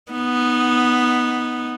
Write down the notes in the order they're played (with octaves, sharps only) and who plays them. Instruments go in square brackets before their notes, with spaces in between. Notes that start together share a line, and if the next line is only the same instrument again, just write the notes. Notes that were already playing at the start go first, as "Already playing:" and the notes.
[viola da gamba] B3 D#4